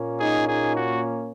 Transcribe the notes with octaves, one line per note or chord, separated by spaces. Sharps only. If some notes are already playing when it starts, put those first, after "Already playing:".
Already playing: A#2 A#3 C#4
D#4 G#4
D#4 G#4
F#4